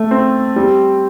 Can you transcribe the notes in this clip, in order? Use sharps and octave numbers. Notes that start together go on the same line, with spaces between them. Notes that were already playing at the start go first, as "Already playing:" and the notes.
Already playing: A3
C4
G3